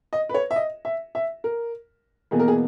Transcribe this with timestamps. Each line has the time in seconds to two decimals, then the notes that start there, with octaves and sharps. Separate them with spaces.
0.13 D#5
0.29 B4
0.34 C#5
0.51 E5
0.56 D#5
0.85 E5
1.15 E5
1.44 A#4
2.31 E2 B2 A#3 G#4
2.39 A#4
2.48 G#4